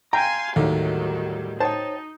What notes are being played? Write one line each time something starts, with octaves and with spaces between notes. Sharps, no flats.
F5 G5 G#5 A#5 C6
D#2 A2 D3 D#3 F#3 G3
D#4 C5 C#5 G5 A5